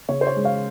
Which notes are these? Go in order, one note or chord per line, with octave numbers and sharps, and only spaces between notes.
C#3 C#5
C5
C#5
G#3
C#5 F5